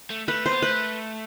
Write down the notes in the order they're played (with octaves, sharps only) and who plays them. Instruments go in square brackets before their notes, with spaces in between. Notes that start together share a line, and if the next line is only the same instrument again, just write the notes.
[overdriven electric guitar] A3
[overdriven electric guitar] A3 [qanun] B4
[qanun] C5
[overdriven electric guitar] B3
[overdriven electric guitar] A3 [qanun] B4